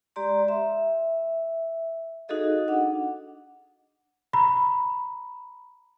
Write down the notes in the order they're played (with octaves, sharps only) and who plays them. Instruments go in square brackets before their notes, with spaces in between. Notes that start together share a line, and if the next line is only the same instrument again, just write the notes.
[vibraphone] G#3 G4 D5 A#5 C6
E5
D#4 F#4 G#4 A4 D#5 F5
D4 F#5
[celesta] A#5 B5